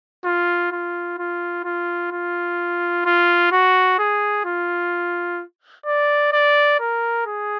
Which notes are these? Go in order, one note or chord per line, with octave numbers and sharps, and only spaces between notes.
F4
F4
F4
F4
F4
F4
F#4
G#4
F4
D5
D5
A#4
G#4